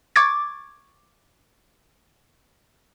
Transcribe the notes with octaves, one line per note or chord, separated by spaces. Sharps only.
C#6 D6 G#6 A6